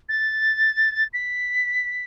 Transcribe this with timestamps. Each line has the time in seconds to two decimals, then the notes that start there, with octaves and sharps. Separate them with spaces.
0.09 A6
1.13 B6